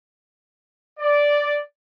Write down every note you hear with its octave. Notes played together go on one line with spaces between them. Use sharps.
D5